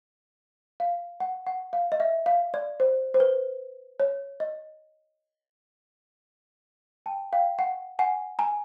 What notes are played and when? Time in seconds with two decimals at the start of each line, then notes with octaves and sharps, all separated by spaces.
0.80 F5
1.20 F#5
1.47 F#5
1.73 F5
1.92 D#5
2.00 E5
2.26 F5
2.54 D5
2.80 C5
3.14 C5
3.20 B4
4.00 C#5
4.40 D#5
7.06 G5 A5
7.33 F5 G5
7.59 F#5
7.99 F#5 G#5
8.39 G#5 A#5